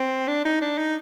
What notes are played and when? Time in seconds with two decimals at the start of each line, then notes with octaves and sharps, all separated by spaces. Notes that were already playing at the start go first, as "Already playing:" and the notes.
Already playing: C4
0.28 D4
0.45 D#4
0.61 D4
0.78 D#4